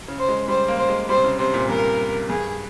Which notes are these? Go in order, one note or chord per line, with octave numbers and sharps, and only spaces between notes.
C#3
C5
G#3
G3 C5
A#3
C5
G#3
G3 C5
C3
C#3
C3 C5
A#2
G2 A#4
G2 G#4